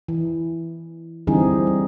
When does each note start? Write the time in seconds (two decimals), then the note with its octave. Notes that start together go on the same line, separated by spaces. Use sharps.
0.08 E3
1.27 D3 E3 G3 C4 D#4 G#4
1.67 G3